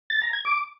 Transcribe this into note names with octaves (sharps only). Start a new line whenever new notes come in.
A6
A#5
G#6
D6